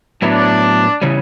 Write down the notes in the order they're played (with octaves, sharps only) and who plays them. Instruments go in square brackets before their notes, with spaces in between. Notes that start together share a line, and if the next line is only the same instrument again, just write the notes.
[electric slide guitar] A2 F#3 B3 E4 [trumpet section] D4
[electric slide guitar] C#3 E3 G3 C#4